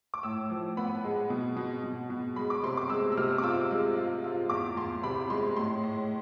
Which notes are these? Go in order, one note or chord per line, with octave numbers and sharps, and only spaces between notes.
D6
A2 E6
F3
B3 B5
G#3
B2
B2
B2
B2
G#3 B5
D6
C3 C6
D6
G#3 E6
E6
C3 F6
D6
F4 E6
G#3
F4
F4
E2 D6
E2 C6
C3 B5
G#3 C6
A2 C6
A2